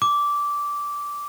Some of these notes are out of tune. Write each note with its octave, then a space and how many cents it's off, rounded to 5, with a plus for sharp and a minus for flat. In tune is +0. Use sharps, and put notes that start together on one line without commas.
D6 -15